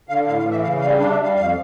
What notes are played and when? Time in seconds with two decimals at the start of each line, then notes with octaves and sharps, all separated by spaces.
0.09 D3 F5
0.27 A2 F5
0.39 F5
0.45 E3
0.51 E5
0.63 C#3 F5
0.81 G3 F5
0.99 D4 F5
1.11 E5
1.17 G3
1.23 F5
1.35 F2 F5